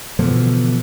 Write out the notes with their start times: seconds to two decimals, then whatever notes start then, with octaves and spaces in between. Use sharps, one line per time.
0.19 B2 D3 E3 F3